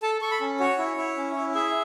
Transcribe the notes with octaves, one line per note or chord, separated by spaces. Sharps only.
A4 A5
A4 C#6
B5
C#4
F#4 C#5
E4
E4
C#4
E4
G#4 E5